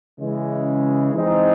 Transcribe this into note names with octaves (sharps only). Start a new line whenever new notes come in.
C#3 E3 G#3
E3 G#3 C4 D#4